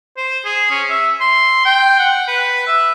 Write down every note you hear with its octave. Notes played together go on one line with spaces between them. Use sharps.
C5
G#4
C#4
E5
C6
G5
F#5
B4
E5